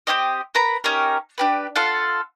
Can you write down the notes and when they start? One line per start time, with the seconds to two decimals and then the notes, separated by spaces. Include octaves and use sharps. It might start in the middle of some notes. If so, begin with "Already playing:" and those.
0.07 C4 C#4 G4 D#5
0.55 A#4 B4 A#5 B5
0.84 C#4 D#4 G4 A#4
1.38 D4 G4 B4
1.76 F4 A4 F5 F#5